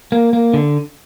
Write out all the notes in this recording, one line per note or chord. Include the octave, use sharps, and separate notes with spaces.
A#3
A#3
D3